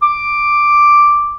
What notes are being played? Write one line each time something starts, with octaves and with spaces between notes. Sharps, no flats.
D6